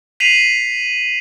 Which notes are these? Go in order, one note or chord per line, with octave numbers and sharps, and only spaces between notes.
B6 C7 D#7 F7 F#7